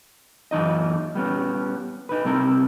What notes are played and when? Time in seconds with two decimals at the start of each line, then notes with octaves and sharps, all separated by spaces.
0.51 F#2 E3 D#4 D#5
1.15 G3 B3 C#4
2.09 D#4 B4
2.25 C3 G3 C4 A#4